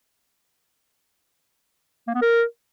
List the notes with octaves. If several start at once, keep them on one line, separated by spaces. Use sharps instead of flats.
A#3
B3
A#4